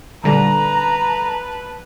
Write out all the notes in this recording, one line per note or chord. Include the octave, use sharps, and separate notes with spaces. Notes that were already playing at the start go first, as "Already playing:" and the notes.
A#1 D3 G3 B4 A5 A#5